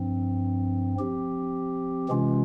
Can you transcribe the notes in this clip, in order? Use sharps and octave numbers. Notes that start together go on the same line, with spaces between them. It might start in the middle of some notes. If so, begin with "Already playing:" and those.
Already playing: G2 F3 C4
F3 C4 G4
C3 E3 G#3 C#4 F4